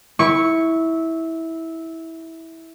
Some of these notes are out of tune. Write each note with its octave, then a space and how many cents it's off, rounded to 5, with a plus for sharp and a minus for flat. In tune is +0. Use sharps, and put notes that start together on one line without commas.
E4 -15 C#6 +0